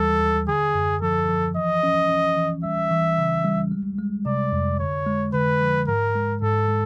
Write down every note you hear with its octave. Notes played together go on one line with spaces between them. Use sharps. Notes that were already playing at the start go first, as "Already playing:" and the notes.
Already playing: D#2 E3 G3 A4
D#2
D3 G#4
F#2
F3 A4
F3
E3 D#5
C#4
C#4
E3
G3 E5
E3
C#3
G3
G#3
G#3
C3 D5
F2
D3 C#5
G#3
D3 B4
F3
G#2 A#4
G#3
G#2 A4
G#3